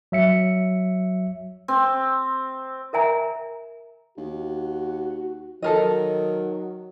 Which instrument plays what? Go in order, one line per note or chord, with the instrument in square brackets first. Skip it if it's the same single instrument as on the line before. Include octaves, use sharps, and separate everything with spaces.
[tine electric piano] F#3 E5 C#7
[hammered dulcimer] C4
[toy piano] A#4 E5 G#5 A#5
[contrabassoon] D#2 [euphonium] F#4
[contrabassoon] D#3 [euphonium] F#3 [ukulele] A4 A#4 D#5